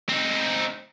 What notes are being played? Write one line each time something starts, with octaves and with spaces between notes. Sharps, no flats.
C4 D#4